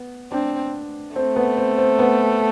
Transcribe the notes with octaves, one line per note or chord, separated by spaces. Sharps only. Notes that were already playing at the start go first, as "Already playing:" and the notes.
Already playing: B3
C4 D4
A3 C4
B3
C4
C4
B3